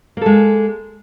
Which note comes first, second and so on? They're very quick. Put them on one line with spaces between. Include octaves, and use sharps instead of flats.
A#3 A4 G#3